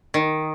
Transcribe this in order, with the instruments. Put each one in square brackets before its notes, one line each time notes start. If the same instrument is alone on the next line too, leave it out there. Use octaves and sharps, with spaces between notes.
[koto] D#3